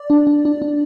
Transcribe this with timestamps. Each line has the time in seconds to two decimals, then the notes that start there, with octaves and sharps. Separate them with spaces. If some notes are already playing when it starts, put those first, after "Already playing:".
Already playing: D5
0.10 D4
0.27 D4
0.45 D4
0.62 D4